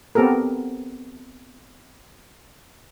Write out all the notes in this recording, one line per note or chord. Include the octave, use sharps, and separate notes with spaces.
B3 C4 G4 A4 A#4